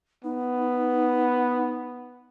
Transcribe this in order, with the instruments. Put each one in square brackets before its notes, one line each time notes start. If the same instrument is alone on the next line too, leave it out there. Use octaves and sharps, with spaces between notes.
[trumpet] B3 [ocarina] D#4